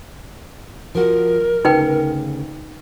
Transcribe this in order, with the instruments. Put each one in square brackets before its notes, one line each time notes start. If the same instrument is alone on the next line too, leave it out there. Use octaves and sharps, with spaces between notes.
[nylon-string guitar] F3 F#4 [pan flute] A#4
[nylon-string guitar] D2 C#3 [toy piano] D#4 B4 G5